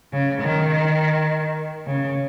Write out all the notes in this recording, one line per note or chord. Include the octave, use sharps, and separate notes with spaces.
C#3
D#3
C#3